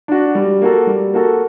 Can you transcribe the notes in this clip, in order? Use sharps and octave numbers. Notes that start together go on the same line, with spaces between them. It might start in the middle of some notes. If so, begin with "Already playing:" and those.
D4 F#4
G3
A#3 F#4 A4
G3
A#3 F#4 A4